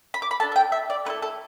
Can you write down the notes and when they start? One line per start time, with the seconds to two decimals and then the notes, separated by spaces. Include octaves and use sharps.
0.14 B5
0.22 D6
0.31 B5
0.40 D4 A4 A5
0.52 E5
0.56 G5
0.72 E5
0.90 D5
1.05 A3 E4 A4 B4
1.22 A4